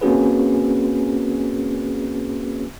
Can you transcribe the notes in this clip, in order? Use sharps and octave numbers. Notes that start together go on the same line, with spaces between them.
A#3 C4 C#4 F#4 G#4 B4